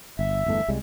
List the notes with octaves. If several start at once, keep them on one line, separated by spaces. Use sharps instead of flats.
G1 E5
G1 E2 A3
C2 G3 G#3